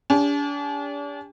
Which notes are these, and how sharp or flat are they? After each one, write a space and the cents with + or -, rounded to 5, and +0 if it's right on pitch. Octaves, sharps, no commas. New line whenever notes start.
D4 -40 G4 +45